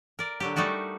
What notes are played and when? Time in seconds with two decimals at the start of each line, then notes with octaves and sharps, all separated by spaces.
0.19 A#4 D5
0.40 D3 F#3 G4
0.56 G3 A3 D#4 F#4 A#4